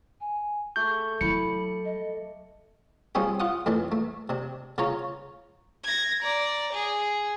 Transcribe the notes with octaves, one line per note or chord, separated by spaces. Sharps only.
G#5
A3 G4 A4 C#6 G6
F#3 E4 B5 C#7
D#5
F3 G3 C4 C#4 G#4
F4 F#5 D#6
F2 A2 E3 A5
A3
C3 D4
C#3 F4 C#5 A#5
G#6 A#6
D5 A#5
G#4